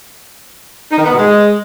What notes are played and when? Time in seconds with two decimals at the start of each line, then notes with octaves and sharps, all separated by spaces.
0.91 D#4
0.98 D#3
1.05 B3
1.12 B2
1.19 G#3